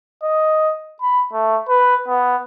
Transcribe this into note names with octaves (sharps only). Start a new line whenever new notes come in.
D#5
B5
A3
B4
B3